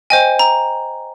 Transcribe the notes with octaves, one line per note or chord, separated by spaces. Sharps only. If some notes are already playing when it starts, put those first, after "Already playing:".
C5 D#5 G5 G#5
A#5